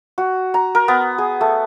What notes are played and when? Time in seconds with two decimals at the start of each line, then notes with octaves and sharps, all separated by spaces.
0.18 F#4
0.54 A#5
0.75 A#4
0.88 B3
1.18 G#4
1.41 A3